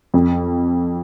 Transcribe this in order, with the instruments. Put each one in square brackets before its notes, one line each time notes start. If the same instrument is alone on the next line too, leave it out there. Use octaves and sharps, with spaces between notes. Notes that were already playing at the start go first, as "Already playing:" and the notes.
[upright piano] F2